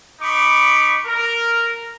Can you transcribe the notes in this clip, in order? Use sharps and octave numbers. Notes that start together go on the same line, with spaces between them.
D#4 B5 C#6 D6
A#4